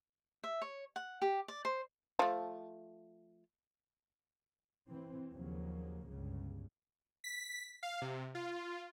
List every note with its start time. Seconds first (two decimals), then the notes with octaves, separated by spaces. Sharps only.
0.44 E5
0.62 C#5
0.96 F#5
1.22 G4
1.48 D5
1.65 C5
2.19 F3 A3
4.89 E3 C4
5.32 D#2 C#3 F3 F#3 A#3
6.09 G1 C#2 G2 C#3
7.24 B6
7.83 F5
8.02 C3
8.35 F4